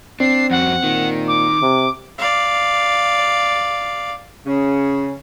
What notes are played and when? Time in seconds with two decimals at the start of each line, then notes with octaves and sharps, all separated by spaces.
0.20 C4 D4 C7
0.51 F2 F#4 F#5
0.84 A#2 D#3
1.27 D6
1.62 C3
2.19 D5 F5
4.46 C#3 C#4